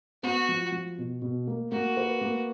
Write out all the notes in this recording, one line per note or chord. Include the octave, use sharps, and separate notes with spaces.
B3 F#4
F3
F3
B2
B2
A#3
A#3 F#4
B4
A#3